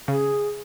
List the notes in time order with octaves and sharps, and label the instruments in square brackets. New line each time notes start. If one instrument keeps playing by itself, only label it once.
[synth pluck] C#3 [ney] G#4